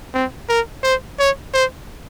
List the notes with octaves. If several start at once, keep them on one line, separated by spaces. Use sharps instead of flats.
C4
A#4
C5
C#5
C5